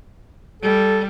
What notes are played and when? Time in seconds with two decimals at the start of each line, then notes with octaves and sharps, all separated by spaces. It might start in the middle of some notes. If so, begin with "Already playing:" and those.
0.62 G3 A4